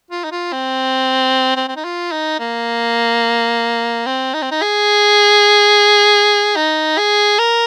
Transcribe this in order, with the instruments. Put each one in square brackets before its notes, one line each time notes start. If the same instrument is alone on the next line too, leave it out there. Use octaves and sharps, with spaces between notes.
[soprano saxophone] F4
D#4
F4
C4
C4
C4
D#4
F4
D#4
A#3
C4
D#4
C4
D#4
G#4
D#4
G#4
A#4